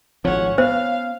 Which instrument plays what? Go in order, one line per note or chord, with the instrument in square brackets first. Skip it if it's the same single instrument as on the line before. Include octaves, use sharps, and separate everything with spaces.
[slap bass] G#1 F3 [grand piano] C#4 [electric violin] C#5 F#5
[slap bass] B3 [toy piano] C5 [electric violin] F5